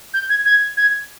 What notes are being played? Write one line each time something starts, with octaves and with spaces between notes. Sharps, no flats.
G6
G#6
G#6
G#6